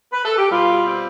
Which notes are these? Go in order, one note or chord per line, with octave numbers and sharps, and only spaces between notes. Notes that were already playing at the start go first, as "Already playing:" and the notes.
B4
A4
G4
B2 G3 F4
C4